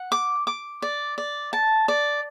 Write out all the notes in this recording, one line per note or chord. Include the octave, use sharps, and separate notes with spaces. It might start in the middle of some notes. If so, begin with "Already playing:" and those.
Already playing: F#5
D6
D6
D5
D5
A5
D5